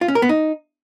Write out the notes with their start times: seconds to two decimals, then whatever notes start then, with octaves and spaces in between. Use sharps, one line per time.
0.01 F4
0.08 C#4
0.15 A#4
0.22 B3
0.29 D#4